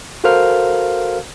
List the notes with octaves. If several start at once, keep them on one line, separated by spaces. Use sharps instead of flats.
F#4 A4 A#4 C5 F5 F6